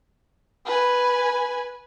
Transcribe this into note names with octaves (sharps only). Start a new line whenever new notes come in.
B4 G#5